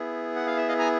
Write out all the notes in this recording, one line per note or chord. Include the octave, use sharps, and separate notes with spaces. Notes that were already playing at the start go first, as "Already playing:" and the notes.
Already playing: B3 E4 G#4
F#5
F5
E5
D#5 F5
G#5 A#5